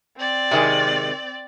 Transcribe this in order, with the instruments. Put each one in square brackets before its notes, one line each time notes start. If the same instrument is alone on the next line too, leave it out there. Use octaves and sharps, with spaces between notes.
[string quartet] C4 D5
[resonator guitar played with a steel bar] C3 D#3 G#3